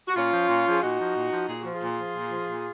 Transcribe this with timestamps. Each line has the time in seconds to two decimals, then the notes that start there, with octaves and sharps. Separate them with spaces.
0.08 F#4
0.15 A#2 C#4 F4
0.32 F3
0.49 A#2
0.66 F3 G#4
0.82 A#2 D#4 F#4
0.99 F3
1.16 A#2
1.32 F3
1.48 A#2 G#4
1.61 F3 F#4
1.74 F4 G#4
1.81 A#2
1.99 F3
2.15 A#2
2.31 F3
2.48 A#2